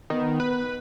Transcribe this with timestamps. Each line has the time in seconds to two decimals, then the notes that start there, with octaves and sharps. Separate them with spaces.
0.10 D#3 B3
0.40 B4